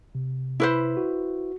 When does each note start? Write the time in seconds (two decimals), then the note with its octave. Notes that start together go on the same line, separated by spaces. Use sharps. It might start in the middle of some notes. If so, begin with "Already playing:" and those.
0.15 C3
0.60 E4 B4 C5
0.97 F#4